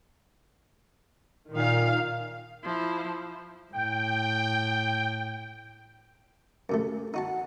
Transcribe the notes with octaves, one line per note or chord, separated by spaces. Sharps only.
A#2 D#3 F5
F3 E4
A2 G5
F#2 C3 A3 C#4
D#4 F#4 F#5 A5